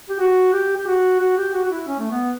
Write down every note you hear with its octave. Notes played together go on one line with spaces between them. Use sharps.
G4
F#4
G4
G4
F#4
F#4
G4
F#4
F#4
E4
C#4
A3
B3